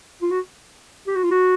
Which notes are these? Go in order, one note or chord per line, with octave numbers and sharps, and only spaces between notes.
F4
F#4
G4
F#4
F4
F#4